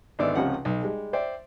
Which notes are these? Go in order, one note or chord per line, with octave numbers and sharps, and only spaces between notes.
G#1 D3 B3 D5 E5 E6
C#2 C3 F3 C#4 F#5
B1
G3 G#3
C5 D5 E5 G5